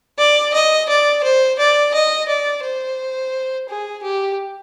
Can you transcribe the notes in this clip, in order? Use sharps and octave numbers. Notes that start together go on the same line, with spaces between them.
D5
D#5
D5
C5
D5
D#5
D5
C5
G#4
G4